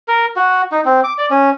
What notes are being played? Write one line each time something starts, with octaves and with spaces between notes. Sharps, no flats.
A#4
F#4
D#4
C4
D6
D5
C#4